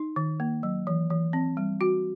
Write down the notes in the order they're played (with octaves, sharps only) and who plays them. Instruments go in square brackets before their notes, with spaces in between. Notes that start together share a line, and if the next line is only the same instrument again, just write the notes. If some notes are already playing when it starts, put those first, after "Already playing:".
Already playing: [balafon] D#4
D#3
A#3
F#3
E3
E3
C4
G3
F#4